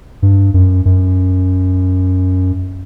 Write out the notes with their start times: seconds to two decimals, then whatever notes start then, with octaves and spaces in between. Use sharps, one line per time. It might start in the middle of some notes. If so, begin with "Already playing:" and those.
0.22 G2
0.54 F#2
0.85 F#2